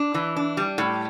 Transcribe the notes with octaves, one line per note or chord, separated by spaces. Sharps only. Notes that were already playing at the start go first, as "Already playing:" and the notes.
Already playing: D4
E3
D4
G3
A2